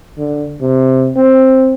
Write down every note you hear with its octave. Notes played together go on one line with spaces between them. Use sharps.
D3
C3
C4